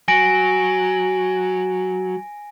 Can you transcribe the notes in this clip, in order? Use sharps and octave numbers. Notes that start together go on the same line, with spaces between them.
F#3 G#5 A#6 D7